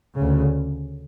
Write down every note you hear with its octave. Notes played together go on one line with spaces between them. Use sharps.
D2 C#3